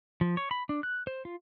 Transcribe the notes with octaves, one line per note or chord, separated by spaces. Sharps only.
F3
C#5
B5
D4
F#6
C5
F4